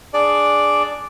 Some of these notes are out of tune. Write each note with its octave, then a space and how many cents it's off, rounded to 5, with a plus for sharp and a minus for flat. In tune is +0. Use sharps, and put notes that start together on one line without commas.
D4 +0 G#4 +0 D5 +0